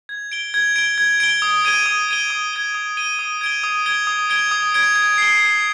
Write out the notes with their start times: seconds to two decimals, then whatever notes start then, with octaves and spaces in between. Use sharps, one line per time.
0.09 G#6
0.32 D7 G7
0.54 G#6
0.76 D7 G7
0.98 G#6
1.20 D7 G7
1.42 D#6
1.65 G#6 D#7 G7
1.86 D#6
2.08 G#6 D#7 G7
2.30 D#6
2.53 G#6 D#7 G7
2.74 D#6
2.96 G#6 D#7 G7
3.19 D#6
3.41 G#6 D7 G7
3.64 D#6
3.86 G#6 D7 G7
4.07 D#6
4.30 G#6 D7 G7
4.51 D#6
4.74 G#6 D7 G7
4.96 G#6
5.18 C7 G7
5.40 G#6